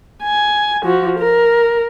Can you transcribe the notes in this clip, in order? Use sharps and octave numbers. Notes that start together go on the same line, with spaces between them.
G#5
F3 F#4
A#4